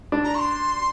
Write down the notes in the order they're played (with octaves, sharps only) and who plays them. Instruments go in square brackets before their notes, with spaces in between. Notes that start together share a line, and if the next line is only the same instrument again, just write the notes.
[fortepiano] D4
[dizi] A#5
C#6
C6